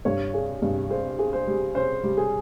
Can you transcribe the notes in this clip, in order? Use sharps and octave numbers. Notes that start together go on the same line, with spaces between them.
G2 C#5
G#4
G2
G#4 C5
G#4
C5
G3
C#4 C5
G3
G#4